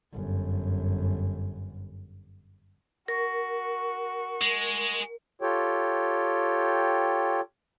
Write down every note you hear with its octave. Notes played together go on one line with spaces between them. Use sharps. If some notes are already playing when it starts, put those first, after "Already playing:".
G1 F#2
F#4 A#4 C#6
G#3
F4 G4 A4 C#5 G5